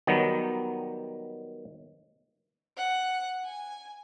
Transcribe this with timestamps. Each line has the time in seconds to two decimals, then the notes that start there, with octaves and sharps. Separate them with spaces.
0.07 D#3 F#3 G3 B3
2.77 F#5
3.44 G#5